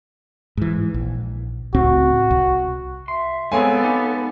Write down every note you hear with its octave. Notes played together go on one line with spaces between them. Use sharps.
G#2 E3
A#1
C#2 A2 C4 F#4
C2
E5 C6
G#3 B3 C4 G#4 A4 C#5 F5 G#5
D#4 G4